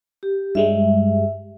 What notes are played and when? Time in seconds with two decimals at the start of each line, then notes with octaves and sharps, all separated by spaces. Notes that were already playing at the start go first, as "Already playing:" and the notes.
0.23 G4
0.55 G2 G3 G#3 E5